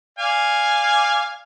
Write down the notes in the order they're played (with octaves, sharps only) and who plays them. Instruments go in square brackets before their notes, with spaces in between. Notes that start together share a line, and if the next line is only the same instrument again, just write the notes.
[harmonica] D5 F5 G#5